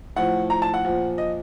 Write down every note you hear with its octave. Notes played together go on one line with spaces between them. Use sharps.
A2 F3 F#5
A#5
A5
F#5
A#2 F3
D#5